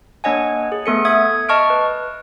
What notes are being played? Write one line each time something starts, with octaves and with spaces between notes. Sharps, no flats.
A#3 D4 C#5 D#5 F#5 G#5
G#4
A3 B3 A4 C#7
E5 D#6 G#6
D#5 A5 C#6 F6 D7
B4